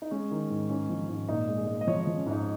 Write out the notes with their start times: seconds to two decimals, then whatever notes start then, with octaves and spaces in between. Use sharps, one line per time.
0.02 D#4
0.11 G#3 C#4
0.31 D#3
0.50 G#2
0.69 G#2 C#4
0.90 F3
1.09 G#2
1.28 A#2 D#4
1.48 G#3
1.57 G#4
1.67 G#3
1.81 D#5
1.87 F3 C#5
2.02 D#5
2.07 F3
2.17 C#4
2.27 G#2 D#4